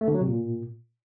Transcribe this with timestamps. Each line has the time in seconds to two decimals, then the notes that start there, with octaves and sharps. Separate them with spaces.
0.01 A3
0.08 D3
0.14 F#3
0.21 C3
0.28 A#2